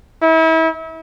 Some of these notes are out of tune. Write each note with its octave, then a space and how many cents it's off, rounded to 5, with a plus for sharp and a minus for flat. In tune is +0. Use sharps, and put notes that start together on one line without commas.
E4 -35